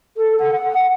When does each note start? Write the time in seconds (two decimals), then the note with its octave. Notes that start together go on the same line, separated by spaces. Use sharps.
0.17 A4
0.40 F#5